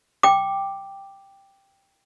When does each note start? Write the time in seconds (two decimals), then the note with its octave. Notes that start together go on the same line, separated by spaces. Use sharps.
0.23 G5 D6